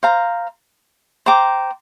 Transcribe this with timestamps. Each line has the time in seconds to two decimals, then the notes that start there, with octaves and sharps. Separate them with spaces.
0.03 C5 F5 A#5
1.26 C5 G5 A#5 D6